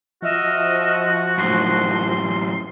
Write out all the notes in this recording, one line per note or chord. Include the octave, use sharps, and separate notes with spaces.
F3 F#4 D#5 E5 F6
F#2 A2 C6